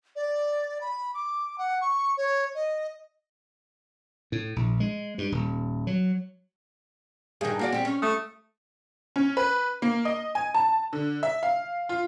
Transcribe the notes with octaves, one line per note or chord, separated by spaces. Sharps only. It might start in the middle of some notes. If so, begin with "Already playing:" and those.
D5
B5
D6
F#5
C#6
C#5
D#5
A2
A#1
G#3
G2
D#1
F#3
G2 D#3 G#4
A#3 F#4 D5
G3 C4
C#4
A3 D#6
C#4
B4
A#3
D#5
G#5
A5
D3
E5
F5
F4